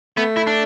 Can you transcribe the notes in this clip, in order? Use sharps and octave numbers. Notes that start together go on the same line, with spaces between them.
A3 B3
E4
D4